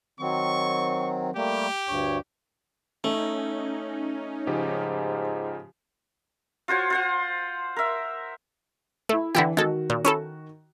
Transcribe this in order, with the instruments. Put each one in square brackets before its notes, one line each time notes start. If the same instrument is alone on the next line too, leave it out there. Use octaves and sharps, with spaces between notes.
[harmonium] D#3 F#3 C4 [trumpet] C#6
[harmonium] G3 A3 A#3 [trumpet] G4
[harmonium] D2 G2 C#5
[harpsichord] A3 [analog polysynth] C#4 D#4
[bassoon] G#2 [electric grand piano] C#3 F3 G4
[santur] F4 F#4 C5 C#5
F4 C5 F#5
A#4 E5
[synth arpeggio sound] A3 [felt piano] E4 E5
[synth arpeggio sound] D3 E4 G4 [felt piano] E3
[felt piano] D#3 F#4 [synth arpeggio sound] G#3 A4
[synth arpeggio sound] A#2
C#4 E4 A4